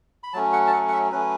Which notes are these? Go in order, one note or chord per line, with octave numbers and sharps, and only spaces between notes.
B5
F#3 A3 C#4 A5
F#5
A5
F#5
F#5
E5
F#3 A3 C#4 B4